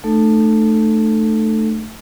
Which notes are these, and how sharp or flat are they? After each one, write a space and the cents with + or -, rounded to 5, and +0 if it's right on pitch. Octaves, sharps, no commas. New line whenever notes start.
A3 +0 D#4 -40 A4 +0